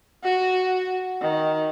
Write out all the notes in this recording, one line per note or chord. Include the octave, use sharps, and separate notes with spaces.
F#4
D#3